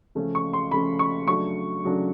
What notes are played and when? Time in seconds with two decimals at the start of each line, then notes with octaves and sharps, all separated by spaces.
0.15 C#3 F3 A3 C#4
0.35 C#6
0.53 C6
0.71 C#3 F3 A3 C#4 B5
0.99 C#6
1.27 C#3 F#3 A3 D4 C#6
1.84 C#3 F#3 A3 D4